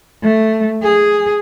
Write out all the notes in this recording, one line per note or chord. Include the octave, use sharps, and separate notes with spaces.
A3
G#4